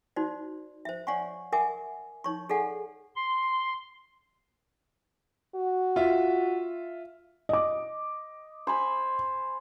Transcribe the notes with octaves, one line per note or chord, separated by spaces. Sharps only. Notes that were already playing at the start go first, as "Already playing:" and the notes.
D#4 F#4 C5 D5
C5 E5
C#5 D5 F5 F#5 G#5 C#6
A#4 E5 F#5 G#5 D6
D#4 C#5 C#6
G#4 A4 D5 F5 F#5 G#5
C6
F#4
F4 E5
D#5 D6
C5 G#5 B5